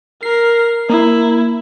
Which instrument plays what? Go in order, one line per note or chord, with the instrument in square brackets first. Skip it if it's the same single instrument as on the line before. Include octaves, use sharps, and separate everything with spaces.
[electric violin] A#4 [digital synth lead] C7
[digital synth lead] A#3 [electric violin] E4